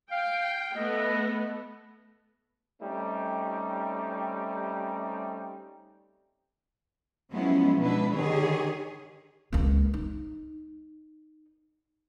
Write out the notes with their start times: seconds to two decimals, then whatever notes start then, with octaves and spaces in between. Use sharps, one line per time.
0.11 F5 G5
0.76 A3 B3 D#5
2.81 G3 A3 C4 C#4 D#4
7.32 F3 F#3 G#3 B3 C#4 E4
7.79 B2 G#3 D4 E4 B4
8.12 D3 D#3 G4 G#4 C#5
9.53 C#2 A#3
9.94 D#4